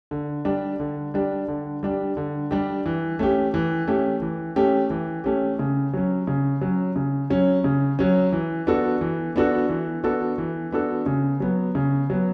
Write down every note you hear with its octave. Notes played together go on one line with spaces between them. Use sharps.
D3
G3 D4 G4
D3
G3 D4 G4
D3
G3 D4 G4
D3
G3 D4 G4
E3
A3 C#4 G4
E3
A3 C#4 G4
E3
A3 C#4 G4
E3
A3 C#4 G4
C#3
F#3 C#4
C#3
F#3 C#4
C#3
F#3 C#4
C#3
F#3 C#4
E3
B3 D4 F#4 A4
E3
B3 D4 F#4 A4
E3
B3 D4 F#4 A4
E3
B3 D4 F#4 A4
C#3
F#3 B3
C#3
F#3 B3